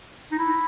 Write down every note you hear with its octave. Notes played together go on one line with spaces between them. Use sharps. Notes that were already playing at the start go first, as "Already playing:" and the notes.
D#4
E4